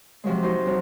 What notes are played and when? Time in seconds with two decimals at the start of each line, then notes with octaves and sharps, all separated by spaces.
0.24 C3 F3 F#3 G#3
0.42 D#4 F#4 C5
0.66 F2 F#3